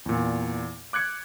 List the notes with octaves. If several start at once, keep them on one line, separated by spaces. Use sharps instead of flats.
E2 A#2
D6 F#6 G#6 C#7